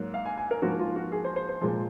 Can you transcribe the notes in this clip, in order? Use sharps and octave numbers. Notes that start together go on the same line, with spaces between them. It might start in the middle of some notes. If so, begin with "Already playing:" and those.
Already playing: G#2 F#3 A#3
F5
G#5
G#5
A#4
G#2 F3 A#3 F#4
F4
F#4
G#4
C5
C5
C5
A#2 F3 G#3